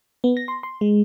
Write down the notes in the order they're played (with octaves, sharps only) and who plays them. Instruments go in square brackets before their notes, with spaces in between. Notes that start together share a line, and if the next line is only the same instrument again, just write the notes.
[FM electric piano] B3
A#6
C6
C6
G#3